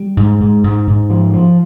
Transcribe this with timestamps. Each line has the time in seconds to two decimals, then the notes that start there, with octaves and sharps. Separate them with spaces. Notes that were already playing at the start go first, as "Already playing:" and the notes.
Already playing: G3
0.17 G#2
0.40 G#2
0.64 G#2
0.87 G#2
1.10 F3
1.34 F3